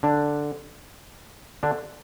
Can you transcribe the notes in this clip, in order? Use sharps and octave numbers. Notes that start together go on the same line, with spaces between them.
D3 D4
D3 D4